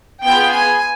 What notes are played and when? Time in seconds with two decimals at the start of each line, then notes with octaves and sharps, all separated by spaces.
0.24 B3 F4 G#4 G5
0.53 G#5